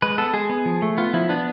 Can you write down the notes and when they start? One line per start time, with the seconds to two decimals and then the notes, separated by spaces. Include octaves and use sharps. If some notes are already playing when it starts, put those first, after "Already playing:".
0.02 G#3 B4
0.18 B3 A4
0.34 G#3 G#4
0.49 B3
0.66 F3
0.82 A3
0.98 B3 F4
1.13 F3 E4
1.29 B3 D4